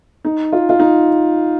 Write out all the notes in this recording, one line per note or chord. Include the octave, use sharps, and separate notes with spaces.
D#4
F4
F4
D#4